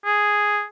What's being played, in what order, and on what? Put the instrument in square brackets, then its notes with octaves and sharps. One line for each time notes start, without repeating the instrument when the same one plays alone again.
[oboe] G#4